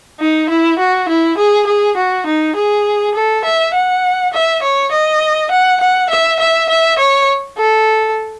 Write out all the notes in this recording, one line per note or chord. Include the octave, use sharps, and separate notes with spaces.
D#4
E4
F#4
E4
G#4
G#4
F#4
D#4
G#4
A4
E5
F#5
E5
C#5
D#5
F#5
F#5
E5
E5
E5
C#5
A4